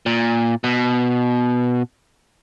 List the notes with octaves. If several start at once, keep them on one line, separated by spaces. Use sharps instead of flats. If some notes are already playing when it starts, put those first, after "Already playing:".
A#2
B2